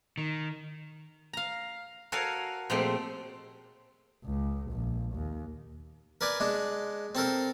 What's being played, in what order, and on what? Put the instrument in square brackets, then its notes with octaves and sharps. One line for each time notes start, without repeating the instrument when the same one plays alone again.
[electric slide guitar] D#3
[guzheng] F5 A#5
F#4 A4 A#4 C#5 F5 G#5
A#2 F3 G#3 A3 C4 G4
[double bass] C#2
A#1
D#2
[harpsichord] A#4 B4 D5 G#5
G#3 D4
C4 A4 A#4 C5